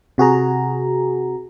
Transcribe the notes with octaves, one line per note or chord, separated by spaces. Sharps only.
C3 F#4 G#4 A#5